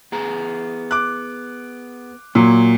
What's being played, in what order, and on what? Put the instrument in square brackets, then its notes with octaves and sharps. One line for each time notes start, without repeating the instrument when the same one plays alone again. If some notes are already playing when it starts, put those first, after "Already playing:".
[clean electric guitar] B3 G#4 A#5
[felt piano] D6 F#6
[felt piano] A#2 F#3 [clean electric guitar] A#3